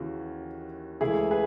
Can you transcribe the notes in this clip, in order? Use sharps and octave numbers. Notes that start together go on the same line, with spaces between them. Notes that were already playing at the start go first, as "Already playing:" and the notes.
Already playing: D#2 C#3 E3 F#4
C#2 C#3 E3 A3 E4 G#4
G#4 B4